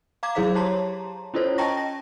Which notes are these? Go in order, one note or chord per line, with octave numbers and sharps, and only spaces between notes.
F5 A#5 D6 G#6
F#3 E4 G#4 C5 F5 B6
G4 C#5 A5 A#5 C6
C#4 E4 F4 A4 C5 C#5
D#5 G5 A5 A#5 C#6 A#6
A#6